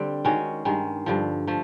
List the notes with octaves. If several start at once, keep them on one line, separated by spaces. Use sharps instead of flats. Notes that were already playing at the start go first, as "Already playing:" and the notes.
Already playing: D3 G3 C4
D#3 G#3 C#4 F#4
G2 D#3 G#3
G2 D3 F3
F3 A3